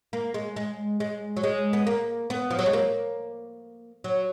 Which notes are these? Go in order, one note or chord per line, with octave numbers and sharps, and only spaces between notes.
A#3
G#3
G#3
G#3
F#3
G#3
B3
A#3
B3
F3
F#3
G#3
A#3
F#3